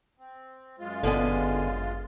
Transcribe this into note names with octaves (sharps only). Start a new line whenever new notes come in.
C4
F#2 G#3 F4
G1 D3 B3 G#5